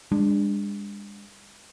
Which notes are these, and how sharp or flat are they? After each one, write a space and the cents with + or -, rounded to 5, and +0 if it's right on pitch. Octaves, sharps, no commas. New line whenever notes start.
G#3 -35 D4 +0